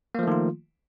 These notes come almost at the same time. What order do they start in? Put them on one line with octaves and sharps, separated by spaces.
A#3 F3 A3 D#3 F4